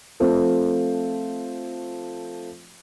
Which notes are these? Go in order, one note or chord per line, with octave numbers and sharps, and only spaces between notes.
F3 A3 C4 F4